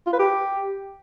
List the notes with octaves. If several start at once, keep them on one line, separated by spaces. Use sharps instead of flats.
F4
B4
G4